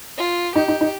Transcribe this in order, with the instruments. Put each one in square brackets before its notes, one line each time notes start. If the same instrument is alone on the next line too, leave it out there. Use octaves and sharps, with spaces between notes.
[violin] F4
[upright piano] D#4 [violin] G4
[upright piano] D#4
D#4